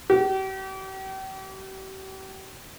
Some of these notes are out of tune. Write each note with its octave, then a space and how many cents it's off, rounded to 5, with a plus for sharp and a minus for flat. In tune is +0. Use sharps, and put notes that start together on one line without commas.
G4 -40